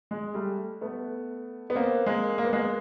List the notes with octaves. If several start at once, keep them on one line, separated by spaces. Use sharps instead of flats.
G#3
G3 A3
A3 B3
B3
A#3 C4
G#3 A#3
A#3
B3
G#3 A#3